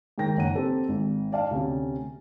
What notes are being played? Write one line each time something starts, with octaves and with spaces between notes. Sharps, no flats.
G#2 D#3 A#4 G5 A#6
F#1 C#4 F#5 A#5 D#7
C4 G4 A4
G#1
D5 F5 A5
D2 C3 C#4